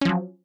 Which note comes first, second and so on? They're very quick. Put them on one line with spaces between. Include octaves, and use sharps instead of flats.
C#4 F3 F#3